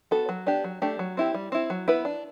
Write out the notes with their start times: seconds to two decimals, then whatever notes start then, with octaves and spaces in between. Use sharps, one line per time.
0.11 B3 F#4 A4
0.29 F#3
0.46 B3 D4 G4
0.64 F#3
0.82 A3 D4 G4
0.99 F#3
1.17 C4 E4 G4
1.34 G3
1.52 C4 E4
1.70 F#3
1.88 B3 E4 B4
2.05 D4